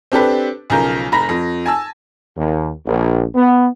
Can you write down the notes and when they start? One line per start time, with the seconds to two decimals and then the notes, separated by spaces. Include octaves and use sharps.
0.12 C4 D4 G4 A4 B4
0.70 B1 C#3 F3 A#4 A#5 G6
1.12 F1 A#5 B5 A#6
1.29 F2
1.66 G#5 A5 E6
2.36 D#2
2.85 A#1
3.35 B3